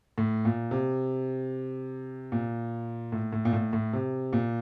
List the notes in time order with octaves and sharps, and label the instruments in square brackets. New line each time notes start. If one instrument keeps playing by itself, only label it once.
[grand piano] A2
A#2
C3
A#2
A2
A2
A#2
A2
A2
C3
A#2